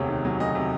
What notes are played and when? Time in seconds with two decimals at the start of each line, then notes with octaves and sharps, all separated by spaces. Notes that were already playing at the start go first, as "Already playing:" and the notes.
Already playing: E1 D2 C3 C#5
0.09 D#3
0.25 F#3
0.40 D2 D#5
0.55 C3